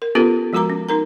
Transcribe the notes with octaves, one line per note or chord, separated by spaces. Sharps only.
A#4
B3 C#4 F4 G4 A4 B4
F3 G#3 F#4 A#4 A#5 D6
C#4
D#4 A#4 A#5